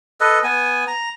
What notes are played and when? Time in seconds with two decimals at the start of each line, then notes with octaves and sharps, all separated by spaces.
0.21 A4 B4 D#5
0.44 B3 G#5
0.88 A#5